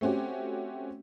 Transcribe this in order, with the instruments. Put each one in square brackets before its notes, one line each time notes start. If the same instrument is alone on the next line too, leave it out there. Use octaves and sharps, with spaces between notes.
[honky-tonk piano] A3 C4 C#4 F#4 G4